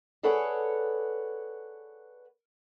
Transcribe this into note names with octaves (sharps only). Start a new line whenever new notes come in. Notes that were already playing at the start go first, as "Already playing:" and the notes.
G#4 A4 B4 C#5 D5 F#5